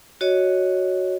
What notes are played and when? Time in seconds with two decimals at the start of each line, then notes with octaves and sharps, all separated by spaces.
0.21 F#4 C#5 D#5